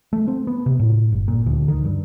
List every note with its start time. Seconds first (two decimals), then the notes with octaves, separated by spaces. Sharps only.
0.13 A3
0.28 C4
0.47 B3
0.66 C3
0.79 A2
1.12 G1
1.28 A#2
1.46 D2
1.68 D#3
1.85 G2